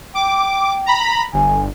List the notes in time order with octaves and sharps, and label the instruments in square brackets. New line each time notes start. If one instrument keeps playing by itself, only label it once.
[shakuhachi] G5 [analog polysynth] D6
[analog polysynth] A#5 B5
[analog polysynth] G1 [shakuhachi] G#5